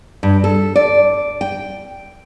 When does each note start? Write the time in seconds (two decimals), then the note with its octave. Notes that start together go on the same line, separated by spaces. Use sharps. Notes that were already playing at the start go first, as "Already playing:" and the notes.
0.23 G2
0.44 A4
0.76 D5
1.41 G5